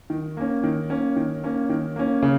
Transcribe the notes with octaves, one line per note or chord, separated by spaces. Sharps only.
D#3
A#3 C#4
D#3
A#3 C#4
D#3
A#3 C#4
D#3
A#3 C#4
C#3